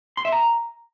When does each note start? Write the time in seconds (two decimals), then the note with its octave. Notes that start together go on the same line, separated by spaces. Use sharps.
0.17 C6
0.25 E5
0.32 A#5